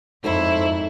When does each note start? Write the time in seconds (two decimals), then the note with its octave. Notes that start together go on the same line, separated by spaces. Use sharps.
0.24 F2 G#2 C#4 E4 A4 C5